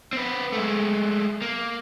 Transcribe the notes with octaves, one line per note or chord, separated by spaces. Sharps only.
C4 B4
G#3 A3
A#3